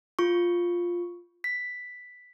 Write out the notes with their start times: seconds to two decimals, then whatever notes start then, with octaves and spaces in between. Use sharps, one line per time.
0.19 F4 C#6
1.44 B6